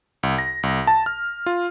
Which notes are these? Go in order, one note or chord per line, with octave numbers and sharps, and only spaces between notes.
C2
A#6
C2
A5
F6
F4